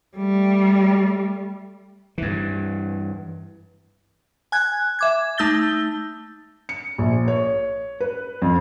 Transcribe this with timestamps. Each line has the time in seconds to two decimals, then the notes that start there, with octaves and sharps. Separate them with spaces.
0.17 G3 A3
2.18 G2 E3
4.52 G#5 F#6 G#6
4.99 E5 D6 G#6
5.38 A3 D#4 E6 G6 A6 G7
6.69 C#7
6.98 A#1
7.28 C#5
8.00 B4
8.42 F2